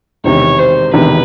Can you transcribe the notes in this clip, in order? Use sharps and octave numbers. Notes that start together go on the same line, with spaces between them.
E1 E2 C3 D#3 C#5
C5
E1 E2 C3 D#3 B4